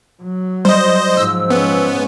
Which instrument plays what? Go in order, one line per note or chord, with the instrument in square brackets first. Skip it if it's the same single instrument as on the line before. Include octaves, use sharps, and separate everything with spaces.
[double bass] F#3
[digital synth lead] G3 [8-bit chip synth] C5 D#5
[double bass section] G#2 F3 [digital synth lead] E6
[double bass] G#3 C#4 [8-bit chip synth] B3